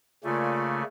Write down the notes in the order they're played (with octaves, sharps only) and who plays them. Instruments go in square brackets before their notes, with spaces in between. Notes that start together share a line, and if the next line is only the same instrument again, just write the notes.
[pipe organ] C#3 A3 [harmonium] A#3 D5 G#5 [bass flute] F4